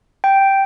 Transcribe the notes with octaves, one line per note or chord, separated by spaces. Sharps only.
G5